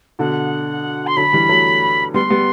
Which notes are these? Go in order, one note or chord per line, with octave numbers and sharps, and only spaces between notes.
B2 D3 F#5
C6
D3 F#3 B5
E3 G3
F#3 A3
G3 B3 C6
G3 B3